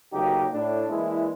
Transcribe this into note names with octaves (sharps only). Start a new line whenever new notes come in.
D2 C#3 F#3 A#3 D#4 G4
A2 D4
E3 G#3 A#3 D4 E4